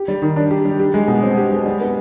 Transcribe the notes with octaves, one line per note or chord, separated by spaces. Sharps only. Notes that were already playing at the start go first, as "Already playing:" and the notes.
Already playing: G4
G3
D#3
D4
G4
G3
G4
G#3
B2
C4
G4
G#3
G3
B3